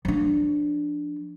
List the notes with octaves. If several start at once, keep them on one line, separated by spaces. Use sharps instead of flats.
F3 D4